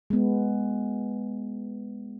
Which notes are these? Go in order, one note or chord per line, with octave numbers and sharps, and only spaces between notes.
G#3 B3